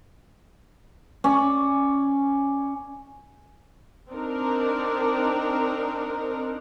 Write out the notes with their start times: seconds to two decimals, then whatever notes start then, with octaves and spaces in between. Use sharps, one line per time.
1.24 C#4 D5
4.10 C4 D4 D#4 A#4